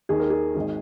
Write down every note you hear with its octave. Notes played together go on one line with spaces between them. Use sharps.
D#2 D#3 G#4
A#4
G#4
G#1 D#3